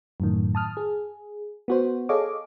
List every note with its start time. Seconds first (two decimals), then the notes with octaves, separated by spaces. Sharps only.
0.20 F#2 A2 D#3
0.55 A5 D#6 F6
0.77 G#4
1.68 B3 F#4 C5
2.09 G#4 A4 C#5 D#5 F5 D6